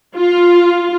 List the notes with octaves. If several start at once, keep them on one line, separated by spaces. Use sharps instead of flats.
F4